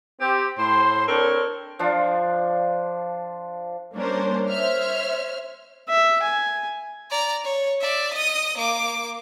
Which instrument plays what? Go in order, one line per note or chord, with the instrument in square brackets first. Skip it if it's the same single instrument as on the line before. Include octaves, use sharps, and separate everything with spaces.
[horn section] C4 G4
A2 C5 C6
C4 D4 A4 A#4 C#5
[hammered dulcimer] F3 D4 F4
[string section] G3 A#3 C#4 D4 A#4 C5
C5 C#5 E5 F6
[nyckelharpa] E5
G#5
[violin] D5 A#5
C#5
D5 E5
D#5 D#6
A#3 D6